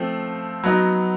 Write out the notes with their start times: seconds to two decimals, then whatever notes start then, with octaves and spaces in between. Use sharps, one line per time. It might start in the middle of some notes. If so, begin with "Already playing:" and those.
Already playing: F3 A3 C4
0.64 F#3 B3 D#4